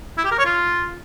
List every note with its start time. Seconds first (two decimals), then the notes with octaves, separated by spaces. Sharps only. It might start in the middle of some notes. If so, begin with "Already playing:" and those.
0.17 E4
0.24 G4
0.31 A#4
0.38 C#5
0.45 F4